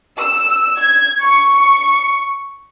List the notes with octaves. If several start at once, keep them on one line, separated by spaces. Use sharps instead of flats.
E6
G#6
C#6